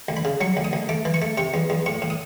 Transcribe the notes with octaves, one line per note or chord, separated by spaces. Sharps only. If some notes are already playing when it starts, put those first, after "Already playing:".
D2
B5
C#3
F#3 C#6
D2
D#6
D2
A3 D6
E3
C#6
A3
C3 C#6
E2
E2
A2 C#6
A2
D#6